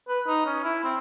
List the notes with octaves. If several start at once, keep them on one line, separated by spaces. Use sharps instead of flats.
B4
D#4
C#4
E4
C4